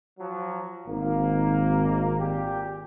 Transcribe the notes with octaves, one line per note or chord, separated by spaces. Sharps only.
F3 F#3
G#1 A#3
A#2 G4